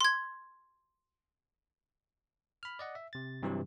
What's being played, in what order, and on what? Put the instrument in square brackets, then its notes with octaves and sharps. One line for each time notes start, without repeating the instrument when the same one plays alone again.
[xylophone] C6 G#6
[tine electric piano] B5 F6
D5 D#5 F#5
E5
C3 A6
G2 C3 E3 F#3 G4